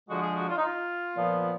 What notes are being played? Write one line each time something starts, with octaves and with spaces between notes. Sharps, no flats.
D3 F3 G#3 F#4
G#4
F#4
F4
D#4
F4
A#2 F3 B3